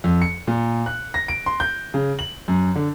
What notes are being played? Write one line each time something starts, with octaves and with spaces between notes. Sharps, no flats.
F2
C#7
A#2
F#6
A#6
D7
C6
G6
C#3
F#7
F#2
D3